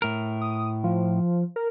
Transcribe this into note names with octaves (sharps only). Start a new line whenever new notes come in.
A2 A#4
D#6
F3
A#4